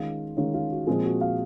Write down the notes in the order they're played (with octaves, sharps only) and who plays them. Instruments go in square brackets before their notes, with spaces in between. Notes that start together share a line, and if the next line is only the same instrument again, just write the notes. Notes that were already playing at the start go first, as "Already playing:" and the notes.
Already playing: [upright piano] D#3 G#3 C#4 F4
D#3 G#3 C#4 F4
F4
F#4
A#2 F3 G#3 C4 G#4
F#4
F5